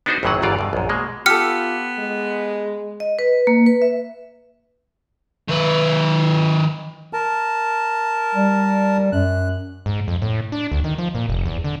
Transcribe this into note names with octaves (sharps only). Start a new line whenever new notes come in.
B3 D4 D#4 F#4 G#4 C5
G#1 F#2 A2 E3 F#3 F#5
G1 E2 G#2 E3 F4 D5
G2 B2
A#1 F#2
B2 G#3 A#3
B3 F4 G4 A4 F6 C#7
G#3
D#5
B4
A#3
B4
E5
D#3 B4
A#4 A5
G3
F#2 F#6
G#2
F2
A2
D4
D2
D#3
F3
A#2
F1
E2
D3